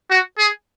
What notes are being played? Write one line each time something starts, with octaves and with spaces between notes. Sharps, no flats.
F#4
G#4